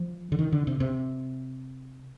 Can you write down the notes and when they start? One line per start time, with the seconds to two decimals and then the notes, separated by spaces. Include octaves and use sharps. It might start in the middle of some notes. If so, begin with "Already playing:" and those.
Already playing: F3
0.32 D3
0.39 D#3
0.52 D3
0.67 C3
0.80 C3